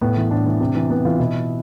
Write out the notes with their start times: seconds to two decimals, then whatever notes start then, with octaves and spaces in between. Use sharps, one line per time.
0.01 A2 B3
0.16 E3
0.31 A2 D4
0.46 E3
0.61 C3
0.75 E3
0.90 C3 B3
1.05 E3 F4
1.19 B2 E4